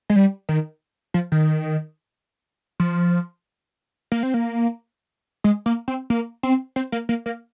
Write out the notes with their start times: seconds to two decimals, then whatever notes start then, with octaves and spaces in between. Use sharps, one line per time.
0.10 G#3
0.16 G3
0.49 D#3
1.14 F3
1.32 D#3
2.80 F3
4.12 A#3
4.23 C4
4.34 A#3
5.44 G#3
5.66 A#3
5.88 C4
6.10 A#3
6.43 C4
6.76 C4
6.92 A#3
7.09 A#3
7.26 A#3